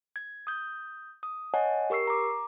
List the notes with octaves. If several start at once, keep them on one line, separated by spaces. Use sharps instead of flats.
G#6
D#6 G6
D#6
C#5 D#5 F#5 G#5 A5
G4 A#4 C#6 E6 C7
A#5 D6